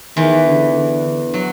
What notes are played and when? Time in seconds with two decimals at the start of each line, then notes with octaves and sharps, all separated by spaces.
0.17 E2 D#3 E3
0.46 D3
0.75 D3
1.34 F#3